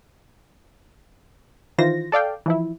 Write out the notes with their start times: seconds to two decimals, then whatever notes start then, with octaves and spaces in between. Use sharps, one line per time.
1.78 D#3 E3 F4 C5 A#6
2.12 A4 D5 F5 G5
2.46 E3 F3 E4